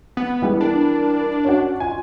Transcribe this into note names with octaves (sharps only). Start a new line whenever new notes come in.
B3
E3 G3 G#4
D4 A#4
C#4 F#4 F#5
F4 G#5